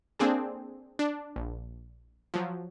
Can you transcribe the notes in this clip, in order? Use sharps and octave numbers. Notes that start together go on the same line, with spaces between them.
A#3 C4 D4 G#4 A4
D4
A#1
F3 F#3